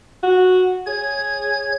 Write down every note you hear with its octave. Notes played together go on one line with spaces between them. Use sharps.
F#4
G#4 C#5 G#6